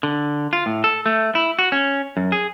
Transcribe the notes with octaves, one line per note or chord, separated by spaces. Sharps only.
D3
F4
A2
A4
A3
E4
F#4
C#4
F#2
G#4